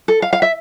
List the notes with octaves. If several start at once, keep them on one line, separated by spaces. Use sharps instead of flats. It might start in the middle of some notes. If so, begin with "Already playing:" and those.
A4
F5
F5
E5